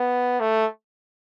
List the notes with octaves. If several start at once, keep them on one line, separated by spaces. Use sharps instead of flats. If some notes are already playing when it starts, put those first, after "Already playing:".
Already playing: B3
A3